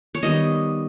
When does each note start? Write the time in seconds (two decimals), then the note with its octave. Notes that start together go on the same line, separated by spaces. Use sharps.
0.15 C#5
0.23 D#3 G3 B3 D#5